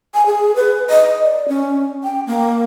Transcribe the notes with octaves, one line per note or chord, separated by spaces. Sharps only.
G#5
G#4
B4
D#5
D5
C#4
G5
A#3